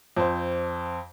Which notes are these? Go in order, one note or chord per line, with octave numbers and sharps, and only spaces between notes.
F2 C5